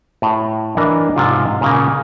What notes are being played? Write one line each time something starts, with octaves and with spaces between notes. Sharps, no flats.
A2
E3 D4 A#4 D#5 A#5
G#2 C3 F3 F4
A#2 C#3 A#3